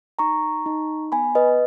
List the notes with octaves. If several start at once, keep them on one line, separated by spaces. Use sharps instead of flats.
D#4 A#5 C#6
D#4
B3 G#5 B5
B4 D#5